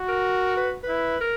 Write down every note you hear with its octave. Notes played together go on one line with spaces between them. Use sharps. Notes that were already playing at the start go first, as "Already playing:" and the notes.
Already playing: F#4
A#4
B4
B4
E4
A#4